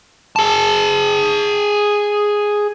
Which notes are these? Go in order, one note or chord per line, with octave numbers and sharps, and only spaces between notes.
G#4 A5